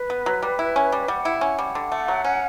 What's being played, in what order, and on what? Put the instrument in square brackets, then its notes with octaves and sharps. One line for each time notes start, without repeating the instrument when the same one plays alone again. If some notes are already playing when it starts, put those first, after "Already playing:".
Already playing: [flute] B4
[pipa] B3
F#3
G3
E4
C#4
G3
[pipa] G3 [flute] F#5
[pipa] E4
[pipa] C#4 [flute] F#5
[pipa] G3
D3
A3
F#3
C#4